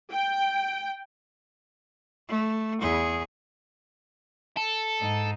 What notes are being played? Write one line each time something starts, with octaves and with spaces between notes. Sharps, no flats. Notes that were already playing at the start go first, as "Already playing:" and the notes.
G5
A3
E2 G#4
A4
G#2 D#4